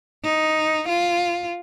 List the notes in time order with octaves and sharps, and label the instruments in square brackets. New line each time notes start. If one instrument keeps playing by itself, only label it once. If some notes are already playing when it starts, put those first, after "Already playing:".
[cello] D#4
F4